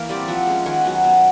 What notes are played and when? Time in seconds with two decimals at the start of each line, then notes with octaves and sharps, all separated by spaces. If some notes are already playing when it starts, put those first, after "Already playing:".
Already playing: E3 A#3 A#4
0.09 G3 C4 C5 D5
0.28 F3 E5 F#5
0.47 G#3 C#4
0.66 D#3 F#5 G#5
0.84 F#3 B3
1.04 B2